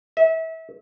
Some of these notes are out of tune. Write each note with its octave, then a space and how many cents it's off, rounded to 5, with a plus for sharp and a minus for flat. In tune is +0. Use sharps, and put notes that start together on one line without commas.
E5 -30